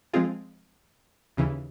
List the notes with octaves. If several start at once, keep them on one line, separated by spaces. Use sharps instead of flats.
F3 G#3 C4 F4 G#4
D#2 C#3 E3